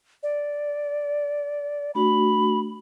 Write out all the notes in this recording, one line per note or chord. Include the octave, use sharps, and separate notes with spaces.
D5
A3 D4 F#4 B5